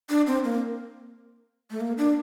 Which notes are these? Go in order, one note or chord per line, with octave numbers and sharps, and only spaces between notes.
D4
C4
A#3
A3
A#3
D4